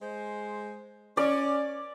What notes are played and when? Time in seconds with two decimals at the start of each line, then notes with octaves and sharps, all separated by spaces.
0.01 G#3 C5
1.17 C#4 D5